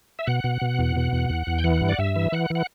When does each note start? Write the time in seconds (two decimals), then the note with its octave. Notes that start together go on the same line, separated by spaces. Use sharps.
0.19 E5
0.27 B2 F#5
0.44 B2
0.62 B2
0.79 E2
0.96 B2
1.13 E2
1.30 E2
1.47 E2
1.59 G5
1.64 E3 F#5
1.81 G2
1.89 D5
1.98 G2 E5
2.16 E3
2.32 E3 F#5
2.50 E3 F#5